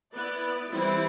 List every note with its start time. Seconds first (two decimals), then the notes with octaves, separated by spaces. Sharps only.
0.13 B3 E4 B4 D5
0.70 E3 G3 C4 E4